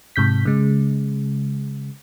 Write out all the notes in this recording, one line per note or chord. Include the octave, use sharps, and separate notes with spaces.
G#2 C3 G6 B6
C#3 G#3